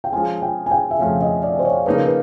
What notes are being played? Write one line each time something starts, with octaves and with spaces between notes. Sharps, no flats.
G5
F3 G#3 C#4 F4 G#5
G5
G#5
G5
E5
F2 C#3 F3 A3 C#4 F5
D#5
D5
C5
C#5
C#3 F3 A#3 D#4 B4
A#4
B4